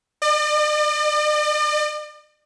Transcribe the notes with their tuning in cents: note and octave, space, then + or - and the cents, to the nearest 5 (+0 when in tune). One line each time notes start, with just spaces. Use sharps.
D5 +45